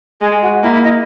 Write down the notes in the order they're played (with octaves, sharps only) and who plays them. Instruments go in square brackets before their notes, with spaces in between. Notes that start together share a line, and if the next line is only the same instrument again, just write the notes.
[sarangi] G#3 [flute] G#4
[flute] F#4
[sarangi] A#3 [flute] E4
[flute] E4
D#5